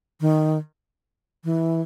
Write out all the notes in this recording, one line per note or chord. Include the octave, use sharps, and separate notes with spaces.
D#3
E3